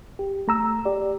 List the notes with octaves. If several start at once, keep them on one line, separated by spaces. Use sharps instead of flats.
G4
A3 A#5 E6
G4 D5